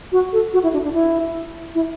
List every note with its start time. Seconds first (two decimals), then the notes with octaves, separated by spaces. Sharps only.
0.12 F#4
0.33 A4
0.53 F#4
0.63 E4
0.73 D4
0.83 D4
0.93 E4
1.75 E4